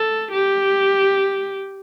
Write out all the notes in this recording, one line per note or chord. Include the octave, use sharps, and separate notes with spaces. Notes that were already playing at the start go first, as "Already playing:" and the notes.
Already playing: A4
G4